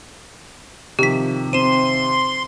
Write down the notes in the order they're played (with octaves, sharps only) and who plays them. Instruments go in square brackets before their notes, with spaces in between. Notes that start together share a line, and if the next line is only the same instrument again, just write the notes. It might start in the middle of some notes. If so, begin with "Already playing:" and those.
[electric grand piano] C3 D#3 F3 [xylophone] G4 B6
[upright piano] C4 [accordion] C6 [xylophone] D#7 E7